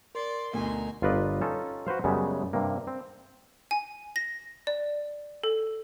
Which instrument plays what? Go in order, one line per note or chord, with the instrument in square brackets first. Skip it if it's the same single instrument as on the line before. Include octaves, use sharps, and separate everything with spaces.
[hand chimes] A#4 [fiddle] D5 [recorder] C6
[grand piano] D2 B2 [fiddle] D#4 G#5
[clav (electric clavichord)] G1 F4 A#4 B4 D5 D#5
C#4 D#4 F4 A4
F#4 B4 C5 F5
F#2 C#3 G3 G#3 B3
G2 C3 A#3
C4
[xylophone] G#5
A#6
D5
A4